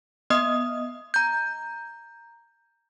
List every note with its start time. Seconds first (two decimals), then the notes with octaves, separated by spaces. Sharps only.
0.30 B3 D#5 D#6
1.14 A#5 G6